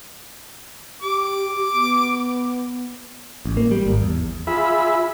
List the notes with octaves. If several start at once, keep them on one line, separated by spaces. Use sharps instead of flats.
G4 D6
B3
A1
A#3
G3
G#1
E2
F4 G#4 E5 B5